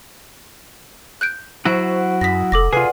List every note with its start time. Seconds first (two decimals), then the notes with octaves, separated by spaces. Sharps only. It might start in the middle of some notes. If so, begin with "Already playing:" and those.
1.21 F#6 G6 D7
1.65 F#3 E4 F#4 C5 F#5 C#6
2.21 F#2 F#5 D#6 A#6 B6
2.52 F1 A4 D6 A#6
2.73 C3 F4 G#4 B4 D5 F#5